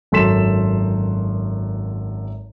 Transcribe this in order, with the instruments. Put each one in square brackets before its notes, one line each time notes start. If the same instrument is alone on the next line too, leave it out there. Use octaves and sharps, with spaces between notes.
[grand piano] G#1 F#2 A4 C6 B6 E7